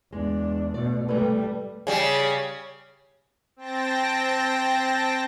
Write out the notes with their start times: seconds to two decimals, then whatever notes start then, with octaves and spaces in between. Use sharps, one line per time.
0.12 E2 G#3 D4
0.74 B2 A3 D5
1.09 C3 G3 A3 B4
1.87 C#3 G3
3.56 C4 G5 A5 A#6